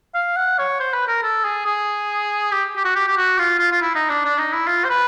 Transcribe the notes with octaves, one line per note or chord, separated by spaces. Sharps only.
F5
F#5
C#5
C5
B4
A#4
A4
G#4
G#4
G4
G4
F#4
G4
G4
F#4
F4
F4
F4
E4
D#4
D4
D4
D#4
E4
F4
C5
B4